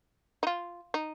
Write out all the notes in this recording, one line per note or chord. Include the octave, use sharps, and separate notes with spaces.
D#4
F4
D#4